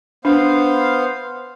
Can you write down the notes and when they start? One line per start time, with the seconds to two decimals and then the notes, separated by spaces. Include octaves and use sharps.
0.25 B3 D4 C5 F5